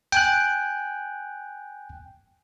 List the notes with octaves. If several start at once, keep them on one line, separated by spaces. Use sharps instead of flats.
G5 G#5 F#6